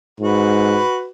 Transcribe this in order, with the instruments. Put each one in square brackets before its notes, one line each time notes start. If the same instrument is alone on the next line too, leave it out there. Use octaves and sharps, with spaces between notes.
[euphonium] G#2 [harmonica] F#4 B4